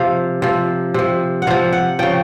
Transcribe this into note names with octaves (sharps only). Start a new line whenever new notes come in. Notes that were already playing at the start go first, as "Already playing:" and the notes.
Already playing: C3 F3 F5
C3 F3
C3 F3
F#5
C3 F3 F5
F#5
C#3 F3 G5